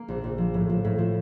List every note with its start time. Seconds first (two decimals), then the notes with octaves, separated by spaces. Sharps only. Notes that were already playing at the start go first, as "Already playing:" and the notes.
Already playing: A#3
0.08 A#1
0.24 A#1
0.38 F3
0.54 A2
0.69 F3
0.84 A2
0.98 F3